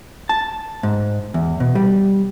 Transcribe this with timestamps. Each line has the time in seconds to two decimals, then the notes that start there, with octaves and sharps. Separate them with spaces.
0.29 A5
0.83 G#2
1.34 E2
1.60 B2
1.75 G3